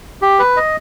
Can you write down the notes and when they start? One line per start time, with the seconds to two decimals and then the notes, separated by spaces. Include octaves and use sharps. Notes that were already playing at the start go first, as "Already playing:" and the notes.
0.22 G4
0.39 B4
0.57 D#5